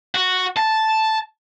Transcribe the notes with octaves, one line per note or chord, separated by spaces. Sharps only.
F#4
A5